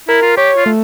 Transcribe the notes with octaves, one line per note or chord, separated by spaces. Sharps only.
E4 A#4
F4
G4 C#5
F4
A3